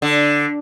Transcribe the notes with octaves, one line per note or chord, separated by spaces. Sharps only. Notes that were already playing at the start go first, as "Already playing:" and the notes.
D3